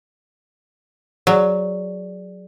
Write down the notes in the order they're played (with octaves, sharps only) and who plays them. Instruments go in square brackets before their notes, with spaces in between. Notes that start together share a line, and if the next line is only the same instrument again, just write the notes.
[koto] F#3 [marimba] G#4 D5